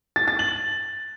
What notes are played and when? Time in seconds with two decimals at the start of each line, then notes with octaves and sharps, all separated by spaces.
0.16 A6
0.28 A6
0.39 F#7